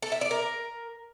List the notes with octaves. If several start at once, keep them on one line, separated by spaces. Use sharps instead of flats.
A4
E5
D5
A#4